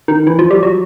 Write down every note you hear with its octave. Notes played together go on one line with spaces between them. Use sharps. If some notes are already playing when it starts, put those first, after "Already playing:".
D#3
E3
F3
G3
F#3